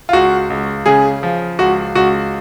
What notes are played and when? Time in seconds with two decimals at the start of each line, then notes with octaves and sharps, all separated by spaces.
0.09 F4
0.13 C#2 F#4
0.50 C#2
0.86 C#3 G#4
1.23 F3
1.59 C#2 F#4
1.95 C#2 F#4